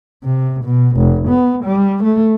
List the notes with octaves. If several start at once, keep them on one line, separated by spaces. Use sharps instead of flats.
C3
B2
F1
B3
G3
A3